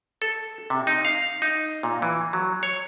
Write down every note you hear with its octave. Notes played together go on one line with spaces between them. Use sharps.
A4
C3
D#4
F5
D#4
A#2
E3
F#3
C#5